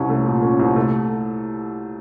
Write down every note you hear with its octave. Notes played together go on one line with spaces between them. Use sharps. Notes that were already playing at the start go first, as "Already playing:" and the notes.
Already playing: C2 C#4
A3
A#2
C#4
C2
A3